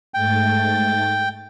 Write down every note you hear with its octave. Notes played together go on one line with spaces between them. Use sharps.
G#2 A3 G5 A6